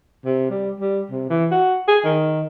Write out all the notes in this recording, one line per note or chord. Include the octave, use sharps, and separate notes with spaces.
C3
G3
G3
C3
E3
F#4
G#4
D#3